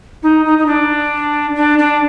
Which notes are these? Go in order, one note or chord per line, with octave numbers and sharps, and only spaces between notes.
D#4
D#4
D#4
D4
D4
D4